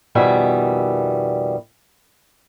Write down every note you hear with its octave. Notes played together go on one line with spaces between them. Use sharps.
F2 B2 D#3 G3 E5 G#5